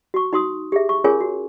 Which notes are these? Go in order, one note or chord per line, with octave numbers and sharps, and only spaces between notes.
F#4 C#6
D#4 F#4 C6 D#6
G4 G#4 E5
C#6
C#4 F4 G#4 A#4 C#5 G#5
F#4